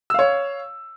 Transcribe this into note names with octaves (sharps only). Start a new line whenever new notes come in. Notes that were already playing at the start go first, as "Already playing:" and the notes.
C#5 F5 E6